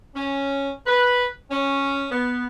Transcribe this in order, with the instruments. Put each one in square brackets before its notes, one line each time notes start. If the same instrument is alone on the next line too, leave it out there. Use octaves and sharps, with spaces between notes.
[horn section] C#4
B4
C#4
B3